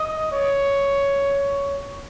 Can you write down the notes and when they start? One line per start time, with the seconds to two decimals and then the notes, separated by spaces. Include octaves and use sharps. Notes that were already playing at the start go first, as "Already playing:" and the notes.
Already playing: D#5
0.31 C#5